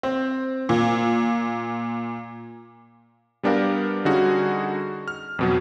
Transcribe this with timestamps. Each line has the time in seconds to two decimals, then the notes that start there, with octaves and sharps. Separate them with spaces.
0.03 C4
0.69 A#2
3.43 G3 B3 D4 G4 A#4 F5
4.05 D3 G3 C#4 D#4 F#4 G#4
5.08 F6
5.39 F2 B2 F#3